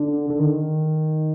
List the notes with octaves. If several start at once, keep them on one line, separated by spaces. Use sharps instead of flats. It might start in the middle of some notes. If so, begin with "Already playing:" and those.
Already playing: D3
D3
D#3